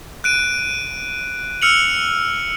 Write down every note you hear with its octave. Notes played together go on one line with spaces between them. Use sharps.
F#6 D7 D#7
E6 F6 C#7 F7 F#7